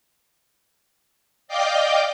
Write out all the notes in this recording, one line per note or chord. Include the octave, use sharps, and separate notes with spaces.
D5 D#5 F5 G5 D6 G6